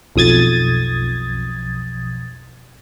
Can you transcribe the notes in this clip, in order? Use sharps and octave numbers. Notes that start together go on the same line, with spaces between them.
B1 F2 D#6 G#6 A6